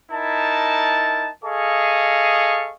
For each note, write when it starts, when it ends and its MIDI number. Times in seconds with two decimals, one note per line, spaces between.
0.12 1.30 63
0.12 1.30 64
0.12 1.30 70
0.12 1.30 81
1.44 2.72 68
1.44 2.72 69
1.44 2.72 75
1.44 2.72 77
1.44 2.72 85